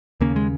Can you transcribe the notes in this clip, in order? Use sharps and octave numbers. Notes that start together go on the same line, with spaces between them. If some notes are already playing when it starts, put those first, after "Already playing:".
D#2 C#3 A#3
G#3